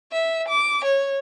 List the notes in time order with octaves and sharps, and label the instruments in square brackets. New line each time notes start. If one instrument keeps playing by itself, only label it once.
[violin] E5
D6
C#5